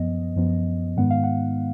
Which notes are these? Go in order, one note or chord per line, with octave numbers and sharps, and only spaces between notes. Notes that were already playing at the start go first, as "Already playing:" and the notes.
Already playing: F#2 F3 B3 D#5
F#2 F3 B3
G#2 D#3 G#3 B3 F#5
F5
F#5